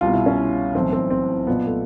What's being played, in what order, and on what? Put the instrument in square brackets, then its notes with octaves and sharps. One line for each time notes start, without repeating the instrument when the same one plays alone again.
[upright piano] C2 B2 F4
E4
C#4
B1 A2 E3 C4
C4
C4
B1 A#2 B3
A3